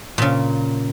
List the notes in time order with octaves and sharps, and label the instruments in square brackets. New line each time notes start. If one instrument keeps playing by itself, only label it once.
[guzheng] A#2 C#3